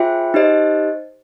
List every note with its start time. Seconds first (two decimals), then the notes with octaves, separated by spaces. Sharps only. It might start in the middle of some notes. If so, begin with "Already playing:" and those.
Already playing: F4 G#4 C5 E5 G5
0.34 D#4 G4 C5 D#5